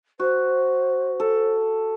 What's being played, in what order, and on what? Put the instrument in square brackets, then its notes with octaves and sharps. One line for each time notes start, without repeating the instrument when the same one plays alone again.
[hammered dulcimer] F#4 [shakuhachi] C5
[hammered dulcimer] A4